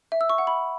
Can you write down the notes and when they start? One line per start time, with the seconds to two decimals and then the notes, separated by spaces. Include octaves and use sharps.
0.12 E5
0.21 E6
0.30 C#6
0.38 F#5
0.47 B5